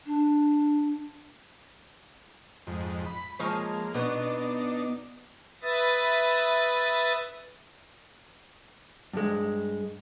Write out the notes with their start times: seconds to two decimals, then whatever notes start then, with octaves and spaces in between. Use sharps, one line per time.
0.06 D4
2.67 F2 G#2
3.06 B5
3.39 F3 G#3 A#3 C#5
3.94 B2 B3 D4 D#4
5.62 B4 E5 D#6 A6
9.13 G2 G#3